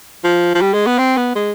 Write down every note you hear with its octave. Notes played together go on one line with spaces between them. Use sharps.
F3
F3
G3
G#3
B3
C4
B3
G#3